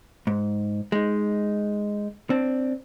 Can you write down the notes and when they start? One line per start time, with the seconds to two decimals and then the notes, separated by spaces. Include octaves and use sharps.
0.27 G#2
0.92 G#3 D#4
2.30 C4 D4